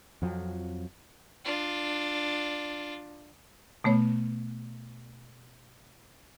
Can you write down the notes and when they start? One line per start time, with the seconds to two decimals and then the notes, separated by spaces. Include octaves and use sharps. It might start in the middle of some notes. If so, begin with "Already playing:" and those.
0.22 F2 F3 F#3
1.44 D4 F4
3.84 B2 A3 B3 C#5